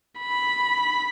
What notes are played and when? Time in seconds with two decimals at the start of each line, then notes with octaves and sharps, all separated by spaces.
0.19 B5